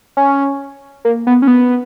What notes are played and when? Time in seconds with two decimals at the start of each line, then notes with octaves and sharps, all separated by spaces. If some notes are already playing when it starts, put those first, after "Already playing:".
0.17 C#4
1.05 A#3
1.27 B3
1.42 C#4
1.47 B3